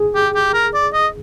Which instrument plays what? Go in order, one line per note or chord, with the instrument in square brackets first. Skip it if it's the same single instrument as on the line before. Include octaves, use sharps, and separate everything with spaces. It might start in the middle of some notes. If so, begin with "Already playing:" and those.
Already playing: [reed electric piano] G#4
[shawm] G4
G4
A#4
D5
D#5